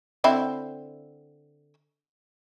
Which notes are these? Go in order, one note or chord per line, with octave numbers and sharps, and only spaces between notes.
D3 C4 E4